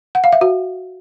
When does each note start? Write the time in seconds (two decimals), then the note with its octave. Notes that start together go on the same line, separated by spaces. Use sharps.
0.15 F#5
0.24 F5
0.33 E5
0.41 F#4